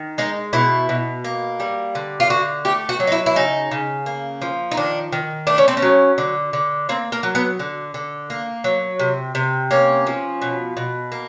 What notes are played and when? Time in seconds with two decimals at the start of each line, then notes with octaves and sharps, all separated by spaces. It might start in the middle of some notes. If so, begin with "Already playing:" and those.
Already playing: D#3
0.18 G#3 D#4
0.53 B2 E4
0.89 B2
1.24 A#3
1.60 G3
1.95 D3
2.20 F4
2.30 D3 F#4
2.65 A3 G4
2.89 F#4
3.00 F#3
3.07 D#4
3.12 E4
3.26 E4
3.36 C#3 D#4
3.71 C#3
4.06 A#3
4.42 F3
4.71 D#4
4.77 D#3 D4
5.12 D#3
5.47 A3 D4
5.58 C#4
5.68 C4
5.77 C#4
5.82 F#3
6.18 D3
6.53 D3
6.89 A#3 C4
7.12 A#3
7.23 F#3
7.35 B3
7.59 D3
7.94 D3
8.30 A#3
8.64 F#3
9.00 C3
9.35 C3
9.71 A#3 C#4
10.07 F3
10.42 B2
10.77 B2
11.12 A#3